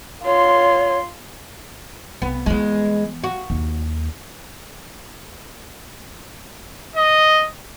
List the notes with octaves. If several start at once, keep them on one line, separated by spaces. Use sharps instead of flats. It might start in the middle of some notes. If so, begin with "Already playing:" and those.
F4 C#5 C6
C2 B3
E2 E3 G#3 B3
F#4
D#2
D#5